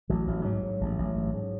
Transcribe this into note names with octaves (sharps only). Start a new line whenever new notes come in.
A1 F#3
A1
G#2 F#3
G#2
A1
A1
G#2
G#2